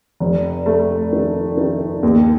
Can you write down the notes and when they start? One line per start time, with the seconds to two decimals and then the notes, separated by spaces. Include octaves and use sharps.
0.20 F1
0.66 A3
1.13 D#3
1.57 D#3
2.03 D#2